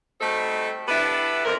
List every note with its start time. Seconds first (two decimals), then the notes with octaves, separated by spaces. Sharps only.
0.21 G3 A3 C4 D#4 F#4 A4
0.88 B3 D4 E4 G4 A4 B4
1.45 F2 A#4